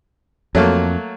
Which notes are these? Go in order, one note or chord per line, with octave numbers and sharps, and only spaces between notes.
F2 F#3 A3 A#3